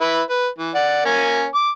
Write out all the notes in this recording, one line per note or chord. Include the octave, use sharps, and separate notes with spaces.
E4 B4 B5
B4
E3
D5 F#5
A#3 C#4 G#5
D6